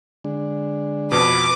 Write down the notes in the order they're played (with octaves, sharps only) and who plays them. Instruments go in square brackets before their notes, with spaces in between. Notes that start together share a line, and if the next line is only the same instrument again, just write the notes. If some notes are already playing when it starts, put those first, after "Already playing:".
[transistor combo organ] D3 G#3 D4
[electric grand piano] F2 B2 [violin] B4 D6